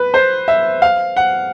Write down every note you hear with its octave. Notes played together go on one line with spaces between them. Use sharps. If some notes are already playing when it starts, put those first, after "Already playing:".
Already playing: B4
C5
E5
F5
F#5